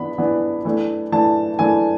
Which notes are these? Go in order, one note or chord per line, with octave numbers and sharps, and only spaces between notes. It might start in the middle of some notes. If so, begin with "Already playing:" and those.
Already playing: E3 B3 D4 B5
E3 B3 D4
E3 A3 D4
E3 A3 D4 A5
E3 A3 D4 G#5